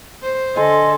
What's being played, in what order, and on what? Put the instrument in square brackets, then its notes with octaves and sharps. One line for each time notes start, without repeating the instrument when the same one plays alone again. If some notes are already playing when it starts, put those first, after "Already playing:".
[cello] C5
[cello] D3 [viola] A4 [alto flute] D#5 [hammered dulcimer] G#5 C6